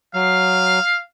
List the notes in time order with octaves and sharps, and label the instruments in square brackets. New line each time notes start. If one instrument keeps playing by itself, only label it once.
[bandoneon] F#3 [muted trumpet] F5